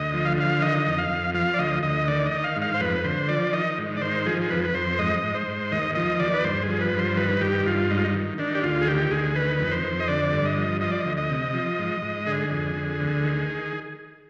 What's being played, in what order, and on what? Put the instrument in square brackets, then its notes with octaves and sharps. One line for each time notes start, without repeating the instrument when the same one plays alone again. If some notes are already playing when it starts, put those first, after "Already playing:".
Already playing: [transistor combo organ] D2 D#5
F3
F5
D3 F5
D#3 D#5
F2
F5
F2
F3 F5
D5
D2 D#5
D2 D#5
D#3 D5
D#5
D#3
F5
G#2
F5
C5
F2 B4
D3 C5
F3 D5
D#3 D#5
G#2
D5
D#3 C5
F3 G#4
G#4
F2 B4
B4
F2 C5
G#2 D#5
G#2
C5
G#2
D#2 D#5
F3 D#5
D#2 D5
B4
G2 C5
G#4
F3
B4
G2
C5
D#3 B4
G2 G4
G2 F4
G#2 D#4
F4
D#4
D#3
D#3 D4
G4
D2 F4
G#4
D#3 G4
D2 G#4
D#3 B4
F2
C5
F2
D#5
D3 D5
G2
D#5
F3
F3 D#5
D5
D#5
D2
D#5
C3
F3
G#2
G#2
D3 G#4
F2
D3
D2
D#3